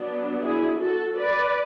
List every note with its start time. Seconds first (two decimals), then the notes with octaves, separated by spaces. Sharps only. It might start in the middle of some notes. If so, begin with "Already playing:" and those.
Already playing: F#3 B3 D4
0.43 E4 G#4
0.80 F#4 A4
1.18 B4 D5